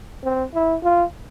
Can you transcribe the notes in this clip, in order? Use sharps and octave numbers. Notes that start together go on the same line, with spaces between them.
C4
E4
F4